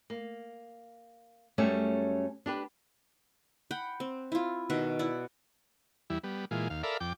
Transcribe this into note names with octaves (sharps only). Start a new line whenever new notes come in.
A#3
F#2 G3 A3 C#4 E5
D4 G4 B4
F#5 G5 B5
C4
E4 F4
B2 D#3 E5 F#5
E4 D5 F#5
E2 G3 E4
G3 B3
A#2 E3 G#3 F4
D#2 F5
A4 A#4 D5 E5 F5 B5
F2 G5 D6